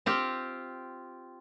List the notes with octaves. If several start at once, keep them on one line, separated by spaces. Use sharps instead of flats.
C4 F4 G4